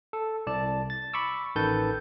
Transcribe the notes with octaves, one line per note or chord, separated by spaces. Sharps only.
A4
C2 D5 A5
A6
B5 C#6 D6 E6
A1 D#3 A4 B4 G6 A6